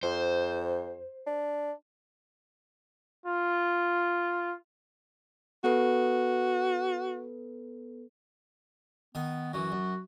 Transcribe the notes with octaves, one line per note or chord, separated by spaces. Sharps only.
F2 C5
D4
F4
B3 F#4 A4 B4
D#3 B3 D#6
F#2 E3 F#4
F#2